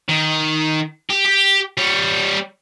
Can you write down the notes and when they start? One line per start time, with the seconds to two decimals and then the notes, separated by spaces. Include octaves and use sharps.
0.09 D#3
1.10 G4
1.25 G4
1.78 G3 C#5